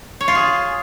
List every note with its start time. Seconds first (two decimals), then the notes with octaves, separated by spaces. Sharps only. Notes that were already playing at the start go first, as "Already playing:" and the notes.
0.21 C#5
0.28 F4
0.35 G#4